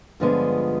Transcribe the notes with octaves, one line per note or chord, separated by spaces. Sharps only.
G2 D3 F3 G#3 B3